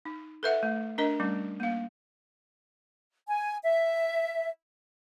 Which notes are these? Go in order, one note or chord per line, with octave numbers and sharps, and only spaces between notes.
D#4
A4 B4 E5 F#5
A3
D4 A#4 D#5
G3 A3 C#4
A#3 F5
G#5
E5